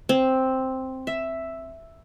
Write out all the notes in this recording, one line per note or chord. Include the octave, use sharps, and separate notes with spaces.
C4
E5